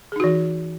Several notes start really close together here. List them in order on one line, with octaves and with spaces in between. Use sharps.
G#4 D#4 F#4 E3